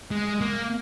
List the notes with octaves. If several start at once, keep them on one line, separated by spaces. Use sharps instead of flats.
G#3
A#3